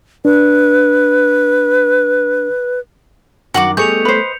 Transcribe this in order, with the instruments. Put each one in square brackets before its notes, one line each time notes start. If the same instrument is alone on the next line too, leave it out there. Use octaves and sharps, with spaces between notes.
[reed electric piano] D4 [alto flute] B4
[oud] F#2 D#3 [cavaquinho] F#4 F#5 D6
[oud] G3 A3 B3 [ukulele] G#4 [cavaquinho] D#5 [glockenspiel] G6 C#7 F7
[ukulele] B4 C5